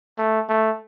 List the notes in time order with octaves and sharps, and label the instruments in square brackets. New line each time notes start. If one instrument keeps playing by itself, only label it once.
[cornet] A3
A3